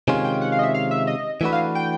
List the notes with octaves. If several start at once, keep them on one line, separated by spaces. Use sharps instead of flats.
C3 D#3 G#3 C#4 F4 G#5
G5
F#5
F5
D#5
E5
F5
E5
D#5
E3 A3 D4 F#4 B4 E5
F5
G5